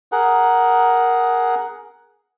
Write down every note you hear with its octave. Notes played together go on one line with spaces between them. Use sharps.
G#4 A#4 F#5